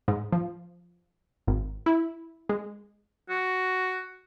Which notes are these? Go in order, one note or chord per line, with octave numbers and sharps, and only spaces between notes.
G#2
F3
G#1
E4
G#3
F#4